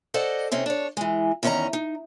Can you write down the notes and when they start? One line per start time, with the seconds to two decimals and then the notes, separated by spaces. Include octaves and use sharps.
0.14 A4 C5 D5 D#5 F#5
0.52 C3 C4 C#4 D#4
0.66 D4 C#5
0.97 E3 G#3
1.43 E2 D#3 C#4 G#4 D#5 A#5
1.73 D#4